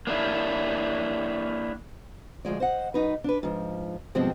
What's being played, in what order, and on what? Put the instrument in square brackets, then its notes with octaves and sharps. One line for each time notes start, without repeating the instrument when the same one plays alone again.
[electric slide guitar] A#3 D4 E4
[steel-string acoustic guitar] D2 F3 G#3 D5
C5 D#5 F#5
F#2 D#4 B4
D4 B4
G#2 F3
G2 B2 F3 G3 G#3 C4